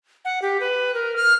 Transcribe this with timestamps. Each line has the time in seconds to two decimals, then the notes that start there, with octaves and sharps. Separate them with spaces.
0.25 F#5
0.42 G4
0.61 B4
0.94 A#4
1.16 F6